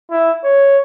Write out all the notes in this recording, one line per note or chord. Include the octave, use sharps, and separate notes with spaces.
E4
C#5